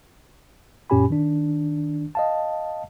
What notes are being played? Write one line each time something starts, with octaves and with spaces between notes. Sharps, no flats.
F#2 A#2 C#4 G4 G#5 B5
D#3 D4
D#5 F5 A5